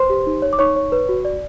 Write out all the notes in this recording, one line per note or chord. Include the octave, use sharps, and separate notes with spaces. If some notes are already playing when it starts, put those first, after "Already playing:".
Already playing: B4 C5 C6
G4
D#4
C#5
D6
D#4 C#5 C#6
C#5
B4
F#4
D5